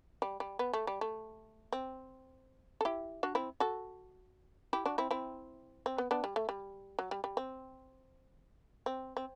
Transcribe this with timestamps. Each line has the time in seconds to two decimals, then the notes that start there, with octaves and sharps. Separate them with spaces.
0.22 G3
0.40 G3
0.59 B3
0.73 A3
0.87 G3
1.01 A3
1.73 C4
2.81 A4
2.85 E4 G4
3.23 D4 F#4
3.35 C4 E4
3.60 F#4 A4
4.73 E4 G4
4.86 D4 F#4
4.98 C4 E4
5.11 C4 E4
5.86 C4
5.98 B3
6.11 B3 D4
6.24 G3
6.36 A3
6.49 G3
6.99 F#3
7.11 G3
7.24 G3
7.37 C4
8.86 C4
9.17 C4